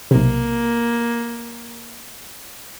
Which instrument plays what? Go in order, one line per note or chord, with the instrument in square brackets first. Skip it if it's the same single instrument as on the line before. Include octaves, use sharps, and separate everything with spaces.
[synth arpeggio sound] B1 C3 [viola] A#3